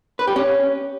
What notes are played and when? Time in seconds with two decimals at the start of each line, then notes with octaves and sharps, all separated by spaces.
0.19 B4
0.27 G4
0.36 C#4